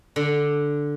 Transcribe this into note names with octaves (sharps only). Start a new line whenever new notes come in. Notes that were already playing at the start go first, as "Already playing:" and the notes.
D3